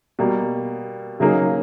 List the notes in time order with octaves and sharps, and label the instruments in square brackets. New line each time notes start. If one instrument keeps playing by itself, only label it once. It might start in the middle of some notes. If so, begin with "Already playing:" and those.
[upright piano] B2 G3 A#3
C#3 F#3 A#3 D#4 G#4